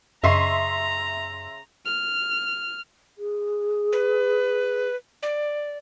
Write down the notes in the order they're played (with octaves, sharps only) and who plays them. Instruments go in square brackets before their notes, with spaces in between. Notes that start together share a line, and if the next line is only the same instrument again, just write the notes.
[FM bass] F#2 [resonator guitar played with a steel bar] C#3 D#5 [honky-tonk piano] E5 C6 C7 [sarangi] A#5
[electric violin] F6
[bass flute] G#4
[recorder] B4
D5